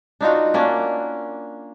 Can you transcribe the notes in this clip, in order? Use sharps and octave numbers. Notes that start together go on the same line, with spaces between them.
D4 D#4 F4 F#4
A#3 C#4 D4